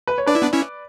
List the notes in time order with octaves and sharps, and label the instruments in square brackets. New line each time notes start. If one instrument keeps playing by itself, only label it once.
[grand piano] B4
C#5
[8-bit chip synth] D4 [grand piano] B4 D5
[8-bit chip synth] E4
B3 D4
C#4 E4